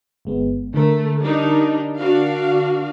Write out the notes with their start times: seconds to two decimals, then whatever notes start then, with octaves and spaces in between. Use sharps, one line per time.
0.25 G1 G#3 B3
0.74 D3 A3 A#4
1.22 G3 D4 D#4
1.97 D4 F#4 F5